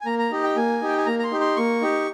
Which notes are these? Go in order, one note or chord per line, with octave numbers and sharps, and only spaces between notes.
G#5
A#3 A#5
A#5
D#4 G4 D#5
G5
A#3 G#5
D#4 G4
G5
G#5
A#3 A#5
A#5
C6
D#4 G4
C6
A#3 C#6
D#4 G4